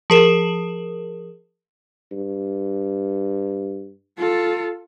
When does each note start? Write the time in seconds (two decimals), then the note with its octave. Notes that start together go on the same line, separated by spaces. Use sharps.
0.10 F3 G#4 A#4 E7 F#7
2.12 G2
4.18 F4 A4